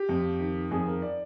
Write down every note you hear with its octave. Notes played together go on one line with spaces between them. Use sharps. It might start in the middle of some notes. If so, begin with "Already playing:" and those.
Already playing: G4
F2
D#3
F2 G#4
A#4
D5